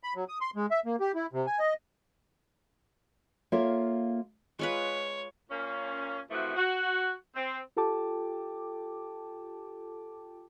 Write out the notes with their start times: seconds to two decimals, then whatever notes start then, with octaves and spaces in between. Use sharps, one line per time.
0.03 B5
0.15 F#3
0.28 D#6
0.41 C6
0.56 G#3
0.71 E5
0.86 A#3
1.00 G4
1.15 E4
1.33 C3
1.46 G#5
1.59 D#5
3.52 A#3 F4 A4 C#5 E5
4.59 G#3 F4 B4 C#5
5.50 A#2 A#3 C#4
6.31 C3 E3 F3 A3 F#4
6.56 F#4
7.36 C4
7.76 F4 G4 A4 G5 A5 D6